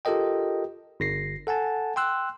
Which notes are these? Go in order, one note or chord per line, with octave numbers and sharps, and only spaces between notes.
F4 G4 A4 A#4 D#5 G5
G1 A#6 C7
A4 F#5 G#5 A5
G5 C6 E6 F#6